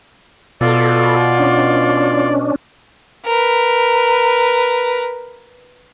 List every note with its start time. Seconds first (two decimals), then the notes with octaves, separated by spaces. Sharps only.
0.61 B2 F4 A4 D5
1.38 C#4 D4
3.26 A#4 B4